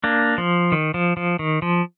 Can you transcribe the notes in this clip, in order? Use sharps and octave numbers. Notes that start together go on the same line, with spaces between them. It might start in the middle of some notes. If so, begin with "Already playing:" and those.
A#3 D4
F3
D#3
F3
F3
D#3
F3